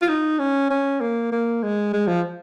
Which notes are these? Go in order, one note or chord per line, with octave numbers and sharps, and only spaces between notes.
F4
D#4
C#4
C#4
A#3
A#3
G#3
G#3
F3